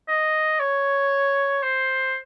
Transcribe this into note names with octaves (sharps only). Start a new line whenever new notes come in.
D#5
C#5
C5